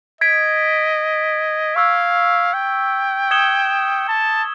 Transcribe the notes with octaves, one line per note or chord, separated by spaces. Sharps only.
D#5 G#6 B6 D7
F5 C#6 E6 G#6
G5
D#6 G#6 C#7 E7 G7
A5